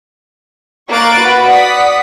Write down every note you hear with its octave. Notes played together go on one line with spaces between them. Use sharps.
A#3 A#4 C#6 F#6 A6 D7
F#4 B4
D5 F#5 D#6 B6